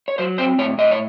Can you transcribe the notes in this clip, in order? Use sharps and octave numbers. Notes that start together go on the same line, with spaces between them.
C#5
F#3 C5
C4 C5
A2 C#5
A2 D#5
C#5